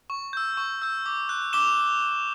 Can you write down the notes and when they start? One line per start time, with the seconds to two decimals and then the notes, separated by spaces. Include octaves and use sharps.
0.10 C#6
0.33 E6 G6
0.57 C#6
0.82 E6 G6
1.06 D6
1.29 F#6
1.53 D6 E7 G7